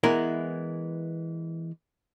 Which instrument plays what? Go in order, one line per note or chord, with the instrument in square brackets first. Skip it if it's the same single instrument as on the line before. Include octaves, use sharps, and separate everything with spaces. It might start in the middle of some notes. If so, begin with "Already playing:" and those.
[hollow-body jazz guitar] E3 G#3 B3 E4 A#4